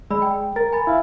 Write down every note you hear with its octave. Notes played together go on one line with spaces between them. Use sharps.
G#3 D5 B5 E6
G5
A#4 A6
G#5 B5 A6
E4 F5